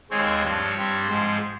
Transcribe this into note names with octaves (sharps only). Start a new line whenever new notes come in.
D#2 D#3 G#3 C4 C#5
G2 F3 C4
G2 G3 C4
G#2 F3 G#3 C5